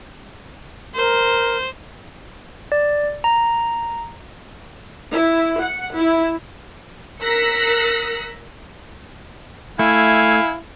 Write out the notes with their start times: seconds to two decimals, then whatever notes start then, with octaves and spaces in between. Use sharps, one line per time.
0.95 A#4 C5
2.72 D5
3.24 A#5
5.13 E4
5.61 F#5
5.96 E4
7.22 A#4 E6 F#6 A#6 B6 C#7
9.79 A3 E4 F5 G#5